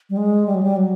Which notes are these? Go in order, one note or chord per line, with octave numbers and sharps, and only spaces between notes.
G3
G#3
G3
F#3
G3
F#3